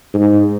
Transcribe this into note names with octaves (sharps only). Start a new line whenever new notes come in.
G#2